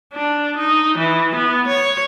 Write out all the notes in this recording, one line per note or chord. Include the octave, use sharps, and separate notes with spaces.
D4
D#4
E3
B3
C#5